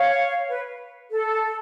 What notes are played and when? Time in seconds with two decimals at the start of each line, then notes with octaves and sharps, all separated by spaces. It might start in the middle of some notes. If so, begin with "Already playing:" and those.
Already playing: C#5 F5
0.49 B4
1.10 A4